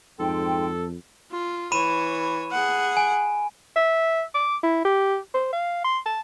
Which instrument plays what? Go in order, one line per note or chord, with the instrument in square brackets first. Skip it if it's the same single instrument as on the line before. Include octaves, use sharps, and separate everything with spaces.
[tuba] F2 [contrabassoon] G#2 [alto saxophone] A4 [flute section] G5 C6
[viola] F4
[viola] E3 C#5 [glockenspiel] B5 D#7 E7
[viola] G#4 F#5
[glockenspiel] G#5
[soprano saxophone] E5
D6
E4
G4
C5
F5
C6
A5